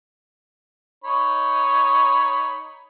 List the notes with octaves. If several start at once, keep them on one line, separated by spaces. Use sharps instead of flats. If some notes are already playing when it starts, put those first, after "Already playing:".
D#4 C#5 B5